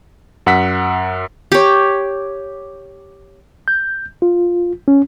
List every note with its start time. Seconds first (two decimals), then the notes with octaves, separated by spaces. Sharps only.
0.46 F#2 F#5 E6 B6
1.52 G4 C#5
3.68 G6
4.22 F4
4.88 C#4